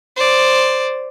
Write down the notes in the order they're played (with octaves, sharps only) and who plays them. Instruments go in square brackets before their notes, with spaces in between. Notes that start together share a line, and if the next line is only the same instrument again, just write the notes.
[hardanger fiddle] C5 D5